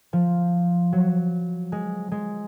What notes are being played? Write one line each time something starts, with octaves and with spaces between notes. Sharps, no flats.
F3
F#3
G#3
G#3